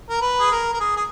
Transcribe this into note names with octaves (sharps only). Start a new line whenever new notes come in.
A#4
B4
G#4
A#4
A#4
G#4
G#4